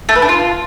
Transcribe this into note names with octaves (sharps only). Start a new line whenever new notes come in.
A3
B4
D4
F4